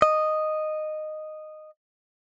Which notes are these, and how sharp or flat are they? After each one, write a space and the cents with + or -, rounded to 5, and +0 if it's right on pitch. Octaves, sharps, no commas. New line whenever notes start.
D#5 -10